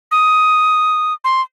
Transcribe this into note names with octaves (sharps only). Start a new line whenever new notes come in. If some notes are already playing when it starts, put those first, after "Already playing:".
D#6
C6